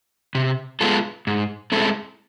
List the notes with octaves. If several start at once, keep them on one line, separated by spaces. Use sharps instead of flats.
C3
G#3 B3 F4 A4
G#2
G#3 C4 E4 A4